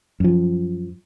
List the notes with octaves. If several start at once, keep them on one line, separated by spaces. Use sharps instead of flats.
F#2 F3